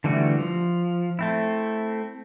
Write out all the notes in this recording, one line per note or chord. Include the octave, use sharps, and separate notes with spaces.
D3 E3 G3 A3 F#4
F3
A3 C4 E4